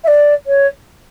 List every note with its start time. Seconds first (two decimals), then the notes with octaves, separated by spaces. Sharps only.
0.04 E5
0.08 D5
0.47 C#5